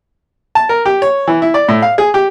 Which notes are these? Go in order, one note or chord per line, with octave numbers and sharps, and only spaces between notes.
A5
A#4
G4
C#5
E3
E4
D5
A2
F5
G#4
G4